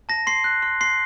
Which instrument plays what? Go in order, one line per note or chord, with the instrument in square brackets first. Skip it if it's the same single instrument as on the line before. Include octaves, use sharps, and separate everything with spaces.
[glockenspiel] A5 A#6
C6 C7
F#6
C6
C6 C7